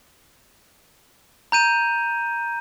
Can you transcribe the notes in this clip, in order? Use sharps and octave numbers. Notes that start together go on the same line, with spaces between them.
A#5 G6 D#7